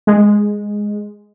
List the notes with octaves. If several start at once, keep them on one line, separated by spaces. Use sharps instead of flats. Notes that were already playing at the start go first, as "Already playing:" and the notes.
G#3